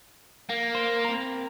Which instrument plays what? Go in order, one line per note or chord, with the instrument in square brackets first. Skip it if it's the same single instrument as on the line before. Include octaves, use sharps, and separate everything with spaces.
[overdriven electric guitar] A#3
[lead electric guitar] C5
C4 A#4